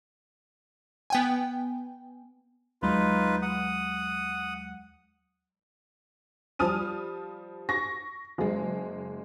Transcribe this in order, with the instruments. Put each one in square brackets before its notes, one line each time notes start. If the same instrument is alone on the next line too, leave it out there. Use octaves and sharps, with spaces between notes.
[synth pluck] B3 G5 G#5
[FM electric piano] D#2 F#3 G#3 [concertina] D#4 F4 B4
[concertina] F#5 D#6
[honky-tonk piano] F3 G3 A5 D#6 F6 D#7
C#6 A#6
F#1 G#3